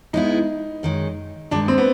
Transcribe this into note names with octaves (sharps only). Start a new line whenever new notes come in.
G#3 B3 D#4 E4
F#2 D#3 G#3
G2 D#3 G#3 D4
C4
B3